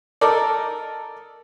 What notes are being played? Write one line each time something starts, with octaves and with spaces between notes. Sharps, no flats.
D#4 A4 A#4 D5